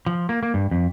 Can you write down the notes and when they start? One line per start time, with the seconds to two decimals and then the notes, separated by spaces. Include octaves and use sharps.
0.06 F3
0.29 A#3
0.43 A#3
0.54 G2
0.71 F2